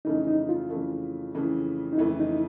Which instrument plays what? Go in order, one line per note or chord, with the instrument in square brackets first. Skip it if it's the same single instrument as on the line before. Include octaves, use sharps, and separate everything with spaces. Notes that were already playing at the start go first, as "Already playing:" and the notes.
[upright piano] F2 C#3 E3 A3 [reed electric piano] D#4
[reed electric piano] D#4
F4
[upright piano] F2 C#3 E3 A3
F2 C#3 E3 A3
[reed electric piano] D#4
[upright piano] F2 C#3 E3 A3 [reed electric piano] E4
[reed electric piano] D#4